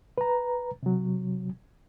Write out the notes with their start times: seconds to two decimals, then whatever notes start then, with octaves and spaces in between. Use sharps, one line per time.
0.18 B4 A#5
0.83 C3 F#3